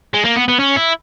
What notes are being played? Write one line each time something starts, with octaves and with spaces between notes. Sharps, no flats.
G#3
A#3
B3
B3
C#4
E4